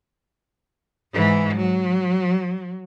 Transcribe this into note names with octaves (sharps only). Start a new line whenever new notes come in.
G#2 E3
F#3